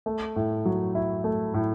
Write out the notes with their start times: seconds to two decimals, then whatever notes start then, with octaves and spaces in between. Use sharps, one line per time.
0.06 A3
0.36 A2
0.65 F#3
0.95 E4
1.24 A3
1.54 A2